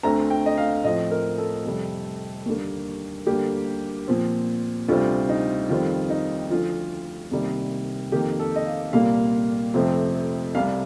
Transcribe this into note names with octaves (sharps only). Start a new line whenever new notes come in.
D2 D3 A3 C4 A#5
G5
D#5
F5
A2 F3 C4 D#5
A#4
A4
F2 C3 G3
D#2 D3 G3 A#3
D2 D3 G3 A#3 G4
A#2 F3 C4
D2 C3 G3 C4 F4
D#4
F2 D#3 G3 C4 F4
D#4
D2 D3 F3 F4
C2 C3 D#3 G3 A#3
F2 D#3 A#3 G4
A4
D#5
F5
C2 A#2 G3 A#3 F5
F2 C3 F3 A3 C4
C2 C3 G3 F5